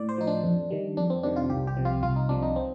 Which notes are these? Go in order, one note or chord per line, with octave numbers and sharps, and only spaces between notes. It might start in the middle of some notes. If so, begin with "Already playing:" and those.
Already playing: A2 D5
C5
F3 D#4
D4
F2
D#3 G3
F2 D4
C4
C3 D#3 D4
F4
C2 G4
G4
C3 F3
F4
C2 F4
D#4
C3 F3 D4
D#4
C4